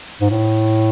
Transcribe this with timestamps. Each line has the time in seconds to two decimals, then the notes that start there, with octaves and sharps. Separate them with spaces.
0.21 G#2
0.31 A2